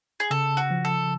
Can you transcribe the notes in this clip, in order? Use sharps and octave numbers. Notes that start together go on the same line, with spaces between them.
G#4
C#3 A4
F#4
F3
A4